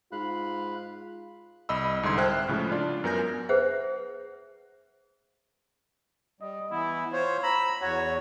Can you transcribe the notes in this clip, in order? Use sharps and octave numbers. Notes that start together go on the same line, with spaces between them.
G#2 F4 F5 B5 F#6
C2 D#5 B5 E6
C2 G#2 D3 C6 G#6
C5 E5 G5 A5 F6 F#6
A2 C#3 F3 G#3
D4 F4 D5
F#2 B3 A#4 G#5 G6 A#6
G#4 B4 C5 E5 F#5
G3 D#5
E3 B3 E4
F4 C5 C#5
A#5 B5 E6
E2 F#4 C#5